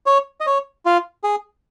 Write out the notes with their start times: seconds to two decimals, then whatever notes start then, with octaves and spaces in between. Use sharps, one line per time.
0.06 C#5
0.41 D#5
0.46 C#5
0.86 F4
1.24 G#4